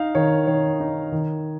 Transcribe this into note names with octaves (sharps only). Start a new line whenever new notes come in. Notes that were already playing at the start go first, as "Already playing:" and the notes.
Already playing: D#4 F5
D#3 C#5
D#3 C#5
D#4
D#3